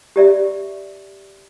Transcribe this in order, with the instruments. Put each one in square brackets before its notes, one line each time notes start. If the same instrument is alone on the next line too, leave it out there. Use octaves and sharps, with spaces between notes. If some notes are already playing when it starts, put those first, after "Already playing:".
[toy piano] G4 D5 E5